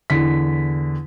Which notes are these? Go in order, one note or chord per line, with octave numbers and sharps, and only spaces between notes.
E2 D3 B6